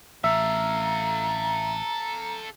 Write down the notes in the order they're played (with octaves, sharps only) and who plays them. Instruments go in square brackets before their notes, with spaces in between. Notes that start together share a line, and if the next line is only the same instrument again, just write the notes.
[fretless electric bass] A1 [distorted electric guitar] A4 F5 [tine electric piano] E5 [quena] A#5